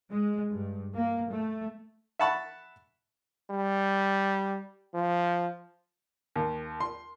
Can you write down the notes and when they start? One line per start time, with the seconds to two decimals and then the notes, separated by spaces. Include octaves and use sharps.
0.10 G#3
0.51 G2
0.94 A#3
1.31 A3
2.19 E5 F#5 A5 B5 C#6
3.51 G3
4.94 F3
6.36 D#2
6.80 C6